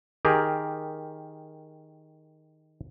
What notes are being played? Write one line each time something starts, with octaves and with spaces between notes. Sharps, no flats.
D#3 G4 G#4 A#4